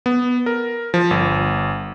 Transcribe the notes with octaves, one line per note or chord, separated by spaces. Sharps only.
B3
A#4
F3
G1